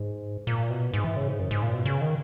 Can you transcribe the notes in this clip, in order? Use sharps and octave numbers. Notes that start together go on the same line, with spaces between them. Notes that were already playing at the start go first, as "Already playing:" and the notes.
Already playing: G#2
A#2
B2
G#2
E3
C#3
G#2
F#2
G#2
A#2
B2
C#3
D#3